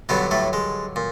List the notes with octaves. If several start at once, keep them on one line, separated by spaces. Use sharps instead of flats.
G2 B2 D3 F#3 B3
A2 A3
G#3
A#2